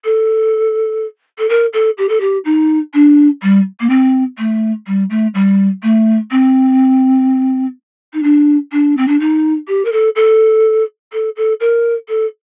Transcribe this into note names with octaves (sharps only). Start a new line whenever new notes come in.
A4
A4
A#4
A4
G4
A4
G4
D#4
D4
G3
A#3
C4
A3
G3
A3
G3
A3
C4
D#4
D4
D4
C4
D4
D#4
G4
A#4
A4
A4
A4
A4
A#4
A4